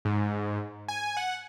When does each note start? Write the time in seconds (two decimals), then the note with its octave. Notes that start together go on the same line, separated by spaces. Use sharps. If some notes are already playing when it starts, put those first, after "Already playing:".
0.05 G#2
0.89 G#5
1.17 F#5